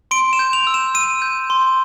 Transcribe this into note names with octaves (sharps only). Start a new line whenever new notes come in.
C6 D7
E7
G6
F7
E6
E7
E6 D#7
G6
C6